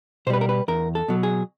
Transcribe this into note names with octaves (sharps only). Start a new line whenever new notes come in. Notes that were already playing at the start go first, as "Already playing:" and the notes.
B2 G3 B4 C5
A#4
B4
E2 A#4
A4
B2 F#3
G#4